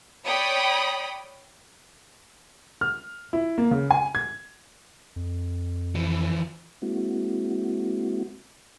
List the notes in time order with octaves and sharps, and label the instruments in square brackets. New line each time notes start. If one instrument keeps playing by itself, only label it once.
[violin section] C#5 D5 G5 B5 D#6
[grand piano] F6
E4
A#3
C#3
G#5
G#6
[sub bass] F2
[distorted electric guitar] E3 F3
[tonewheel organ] G#3 A#3 C4 E4 F#4